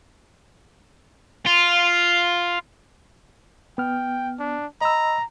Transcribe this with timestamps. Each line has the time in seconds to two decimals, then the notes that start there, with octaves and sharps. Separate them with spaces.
1.46 F4
3.78 B3 G5 F6
4.39 D4
4.81 D#5 A#5 B5 E6